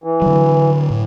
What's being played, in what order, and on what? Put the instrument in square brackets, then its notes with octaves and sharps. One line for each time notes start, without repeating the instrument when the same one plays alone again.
[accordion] E3
[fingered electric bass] D3 F#3
A2